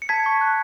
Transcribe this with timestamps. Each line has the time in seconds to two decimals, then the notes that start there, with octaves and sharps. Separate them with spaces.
0.02 C#7
0.09 A5 G#6 B6
0.26 C#6
0.41 F#6